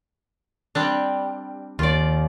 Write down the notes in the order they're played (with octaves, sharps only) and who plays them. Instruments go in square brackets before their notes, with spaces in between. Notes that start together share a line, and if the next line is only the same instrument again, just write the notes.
[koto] G3 C4 D4
[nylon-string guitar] D#2 [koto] F4 D5